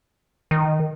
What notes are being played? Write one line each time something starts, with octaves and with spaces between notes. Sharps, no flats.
D#3